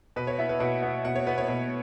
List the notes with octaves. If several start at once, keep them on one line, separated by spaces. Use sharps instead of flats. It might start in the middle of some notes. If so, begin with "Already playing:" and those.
B2 B4
C#5
B3 E4 E5
B4
B2 F#5
B3 E4
B2 F#5
C#5
B3 E4 B4
C#5
B2